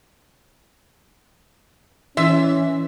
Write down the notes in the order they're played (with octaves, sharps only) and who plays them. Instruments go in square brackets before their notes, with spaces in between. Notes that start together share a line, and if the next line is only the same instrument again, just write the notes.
[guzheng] E3 [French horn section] C#4 [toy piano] E4 D#5 C6 [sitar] E5